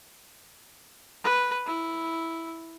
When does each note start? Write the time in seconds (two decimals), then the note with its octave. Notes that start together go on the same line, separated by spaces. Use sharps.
1.24 B4
1.66 E4